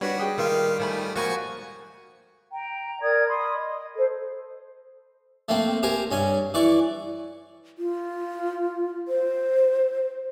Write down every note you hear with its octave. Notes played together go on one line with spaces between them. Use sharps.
G3 D4 F#4 B4 C#5
G#4 B4 G5
D#3 A#3 F4 F5
D#3 A3 C5 G#5 B5
F3 A#3 F#4 F#5 G#5 B5 C#6 C#7
G5 A#5
A#4 D5 D#6 G#6
B5 C6 D#6
D#5
A4 C5
A3 A#3 C4
G4 A#4 C5 G#5
G2 C#4 G#5
E3 D5 C#6
F4
C5